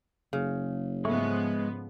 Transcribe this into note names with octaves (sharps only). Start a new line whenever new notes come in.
F#1 C#3
G#2 F3 G#3 A3 B3 C#6